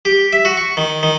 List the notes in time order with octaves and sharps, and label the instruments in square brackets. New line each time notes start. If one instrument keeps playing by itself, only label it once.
[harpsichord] G4
E5
F#4
C#6
D#3
D#3